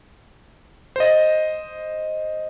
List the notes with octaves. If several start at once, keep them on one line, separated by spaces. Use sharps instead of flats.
C5 D#5